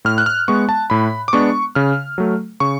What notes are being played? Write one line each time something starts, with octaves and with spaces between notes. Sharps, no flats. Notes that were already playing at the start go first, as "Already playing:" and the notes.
A2 F6
F#6
F6
G#3 B3 C#6
A5
A2 B5
D6
G#3 B3 D4 C#6
C#3 F6
F#3 A3
C#3 C#6